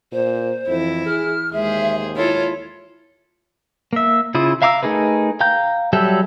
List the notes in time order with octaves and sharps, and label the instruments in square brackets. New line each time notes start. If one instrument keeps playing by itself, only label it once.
[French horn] A#2 [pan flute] C5
[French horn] F2 [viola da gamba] E3 E4
[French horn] G#4 [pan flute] F6
[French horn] D#2 [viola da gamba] G#3 G#4 C5 [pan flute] E5
[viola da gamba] E4 F4 A4 [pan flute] C#5
[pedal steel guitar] A#3 E5
C#3 E4 F4 D#6
E5 F5 A#5 D6 E6
A3 D#4 G#4 A#4 B4
F5 G5 A#5 G6
F#3 G3 G4 A4 E5